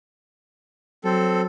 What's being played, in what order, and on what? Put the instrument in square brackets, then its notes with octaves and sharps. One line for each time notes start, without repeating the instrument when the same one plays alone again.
[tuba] F#3 [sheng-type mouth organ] C4 A4